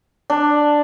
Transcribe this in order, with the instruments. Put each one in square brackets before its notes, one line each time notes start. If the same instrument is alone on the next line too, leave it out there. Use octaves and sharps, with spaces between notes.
[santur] D4